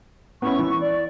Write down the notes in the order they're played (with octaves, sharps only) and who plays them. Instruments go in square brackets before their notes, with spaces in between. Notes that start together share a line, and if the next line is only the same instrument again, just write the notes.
[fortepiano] B3 C#4 E4 [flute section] C#6
[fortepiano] E3
[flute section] D5